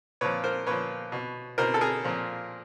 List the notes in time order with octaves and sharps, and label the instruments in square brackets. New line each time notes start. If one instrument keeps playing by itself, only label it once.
[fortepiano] A#2 F3 B4 C#5
A#4 C5
A#2 F3 B4 C#5
B2
B2 A#4 C5
A4
G#4 A#4
A#2 F3